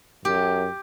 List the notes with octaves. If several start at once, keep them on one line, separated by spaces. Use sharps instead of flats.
F#2 G4